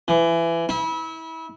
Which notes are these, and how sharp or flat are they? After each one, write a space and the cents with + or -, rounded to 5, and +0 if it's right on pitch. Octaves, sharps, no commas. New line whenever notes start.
E3 +20
E4 -30